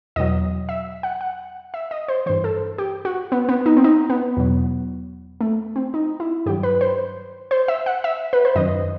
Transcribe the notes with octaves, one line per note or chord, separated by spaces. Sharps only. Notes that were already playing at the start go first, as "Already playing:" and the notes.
E2 B2 F#3 D#5
E5
F#5
F#5
E5
D#5
C5
G2 E3 C5
A4
G4
F#4
B3
B3
D#4
C4
D#4
B3
E2 B2 F#3
A3
C4
D#4
E4
G2 D#3 F#3 G4
B4
C5
C5
E5
F#5
E5
B4
C5
F#2 D#3 F#3 D#5